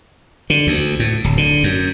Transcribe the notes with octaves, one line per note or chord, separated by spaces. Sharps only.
D3
D2
A2
D1
D3
F#2